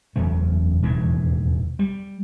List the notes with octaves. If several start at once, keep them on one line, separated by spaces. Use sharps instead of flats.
F#1 E2 C#3 A3
E1 D#2 A2 E3
G3